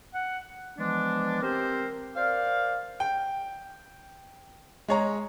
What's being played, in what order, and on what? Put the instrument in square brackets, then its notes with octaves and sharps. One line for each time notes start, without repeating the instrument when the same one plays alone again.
[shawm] F#5
[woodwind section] E3 F3 G#3 B3 D4
C4 G4 A#4 C5
A#4 C5 D5 F5
[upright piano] G5
G#3 C#5 A#5